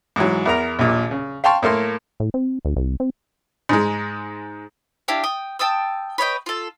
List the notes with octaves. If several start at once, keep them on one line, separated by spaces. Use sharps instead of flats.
G#2 E3 F#3
E2 A#4 A#5
A#1 D#2 A#2
C#3
F5 G5 A5 C6 C#6
A2 A#3 A4 C6
A2
C4
D2
C2
C4
G#2 G#3
D4 E4 G4 F5
G5 D#6
G5 A5 D#6 E6
B4 C#5 D#5 G5
F4 A4